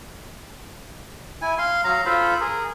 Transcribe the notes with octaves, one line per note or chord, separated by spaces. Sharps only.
E4 G#5
F5 C6
F#3 F5 A#5
F4 A4 C5 B5
G#4 A#4